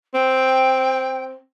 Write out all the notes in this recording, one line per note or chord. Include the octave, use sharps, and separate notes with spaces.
C4 G5